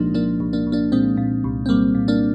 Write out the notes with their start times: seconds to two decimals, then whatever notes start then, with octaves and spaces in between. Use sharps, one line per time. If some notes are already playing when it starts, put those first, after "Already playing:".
Already playing: C2 A#2 F3 G#3 A#3 D4 D#4
0.14 F3 A#3 D4
0.40 C2
0.53 A#3 D4
0.67 C2
0.72 A#3 D4
0.92 A#2 G#3 C4
1.17 A#2
1.44 C2
1.66 C4
1.69 C2 G3 A#3
1.95 A#2
2.08 A#3 D4